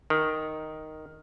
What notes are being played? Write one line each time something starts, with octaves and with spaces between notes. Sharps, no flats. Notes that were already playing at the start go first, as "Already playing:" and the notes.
D#3